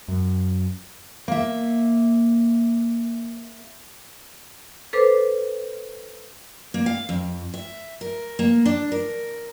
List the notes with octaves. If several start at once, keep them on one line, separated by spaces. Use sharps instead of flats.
F#2
A#3 E5
A4 B4 C5 D6
A#3
F5
F2
E5
A#4
A#3
D4
A#4